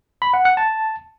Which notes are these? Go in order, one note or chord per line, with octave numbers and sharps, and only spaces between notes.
B5
F#5
F#5
A5